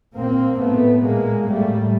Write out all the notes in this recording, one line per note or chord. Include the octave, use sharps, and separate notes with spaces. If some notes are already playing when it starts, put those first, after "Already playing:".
A#2 A#3 C4
A2 A3 B3
A#2 G#3 A#3
A2 G3 A3